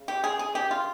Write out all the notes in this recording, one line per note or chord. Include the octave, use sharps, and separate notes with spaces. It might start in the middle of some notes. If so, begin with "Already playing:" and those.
Already playing: C#3
G4
G#4
G#4
G4
F4